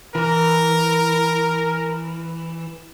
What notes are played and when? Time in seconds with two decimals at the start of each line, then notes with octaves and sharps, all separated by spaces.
0.15 E3 A#4